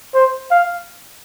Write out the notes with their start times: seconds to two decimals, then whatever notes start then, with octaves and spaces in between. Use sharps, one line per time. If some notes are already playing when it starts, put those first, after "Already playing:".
0.14 C5
0.51 F5